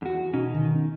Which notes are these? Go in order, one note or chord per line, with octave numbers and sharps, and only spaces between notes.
E2 F#4
B2 C#4 D#4
D#3